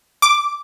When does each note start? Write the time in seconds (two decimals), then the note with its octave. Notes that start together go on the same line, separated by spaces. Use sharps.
0.22 D6